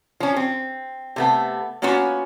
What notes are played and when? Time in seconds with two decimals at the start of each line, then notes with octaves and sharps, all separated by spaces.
0.20 F3 C#4
0.36 C4
1.16 C3 A3 B3
1.82 A#3 B3 C#4 F4 F#4